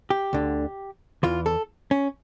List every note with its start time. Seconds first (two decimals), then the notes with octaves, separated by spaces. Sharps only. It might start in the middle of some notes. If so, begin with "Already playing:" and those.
0.10 G4
0.33 D2 D3
1.23 E2 E3 F4
1.46 A4
1.91 C#4